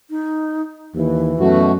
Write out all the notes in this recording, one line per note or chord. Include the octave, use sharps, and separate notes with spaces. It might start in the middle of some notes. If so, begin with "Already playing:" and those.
D#4
D#2 E3
F#2 B2 A3 F#4